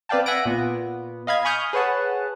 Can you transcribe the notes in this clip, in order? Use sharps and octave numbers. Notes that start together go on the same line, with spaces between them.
C4 B4 D5 F5 G5 A5
E5 F#5 G#5 F#6 A#6 D7
A#2 B3
D#5 F5 B5 G#6
G#5 B5 C#6 D#6 F6 G6
G#4 B4 C#5 F#5 A5